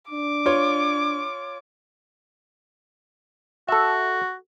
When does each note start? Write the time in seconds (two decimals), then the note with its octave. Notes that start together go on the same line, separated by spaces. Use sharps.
0.10 D4 D6
0.46 F4 C#5
3.68 F#4 A4 E5